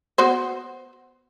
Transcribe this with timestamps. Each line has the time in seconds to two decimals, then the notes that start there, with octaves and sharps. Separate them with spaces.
0.18 B3 F#4 C5